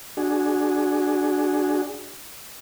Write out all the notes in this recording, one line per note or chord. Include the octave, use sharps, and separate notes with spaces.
D4 F#4 G#4